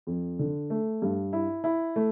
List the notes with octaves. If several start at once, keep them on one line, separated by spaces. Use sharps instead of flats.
F2
D3
A3
G2
E4
E4
A3